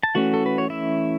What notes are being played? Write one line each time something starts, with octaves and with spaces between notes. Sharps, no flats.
A5
E3 A3 C#4 F#4 F#5
A4
B4
C#5
E4 E5